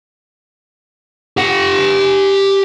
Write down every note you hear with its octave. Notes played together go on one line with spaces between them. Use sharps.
G4 F#5